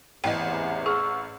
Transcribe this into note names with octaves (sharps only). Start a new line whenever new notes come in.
A1 E2 C3 E3 D#5 G5
G#4 C#6 E6 F6